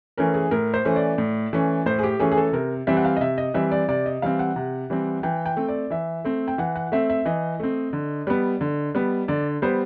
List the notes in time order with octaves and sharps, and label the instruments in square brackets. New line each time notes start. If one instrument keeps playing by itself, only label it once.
[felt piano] E3 A3 C#4 A#4
G#4
A2 A#4
C5
E3 A3 C#4
D5
A2
E3 A3 C#4
A2 C5
G#4
G4
E3 A3 C#4 G#4
G#4
A4
C3 A#4
E3 G3 C4 E5
F#5
F5
D#5
C3 E5
D#5
E3 G3 C4 E5
D5
C3 D5
D#5
E3 G3 C4 F5
F#5
C3
E3 G3 C4
E3 G5
G5
A3 C4
D5
E3 E5
A3 C4
G5
E3 F#5
F#5
A3 C4 E5
E5
E3 D#5
A3 C4
D3
G3 B3
D3
G3 B3
D3 D5
G3 B3 C5